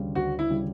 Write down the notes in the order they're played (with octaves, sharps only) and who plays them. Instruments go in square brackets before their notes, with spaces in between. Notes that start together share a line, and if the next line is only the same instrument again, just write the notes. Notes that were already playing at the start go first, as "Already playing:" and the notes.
Already playing: [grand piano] D2 C#3 G3
[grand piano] D2 [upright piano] F#4
[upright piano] E4
[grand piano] C#3 G3